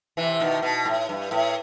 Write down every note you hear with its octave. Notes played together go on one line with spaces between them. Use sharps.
C3 E3
B2 D#3
B2
A2
G2
A2